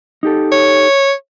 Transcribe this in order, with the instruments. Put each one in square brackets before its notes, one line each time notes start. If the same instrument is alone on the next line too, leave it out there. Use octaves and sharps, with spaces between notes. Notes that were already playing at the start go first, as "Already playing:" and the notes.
[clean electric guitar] D#4 G4 A4
[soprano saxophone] C#5